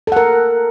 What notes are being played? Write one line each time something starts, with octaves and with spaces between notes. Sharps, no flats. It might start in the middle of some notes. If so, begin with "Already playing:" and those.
A4 A#4 F#5